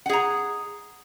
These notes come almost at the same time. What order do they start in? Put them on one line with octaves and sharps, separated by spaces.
F#5 G#4 A#5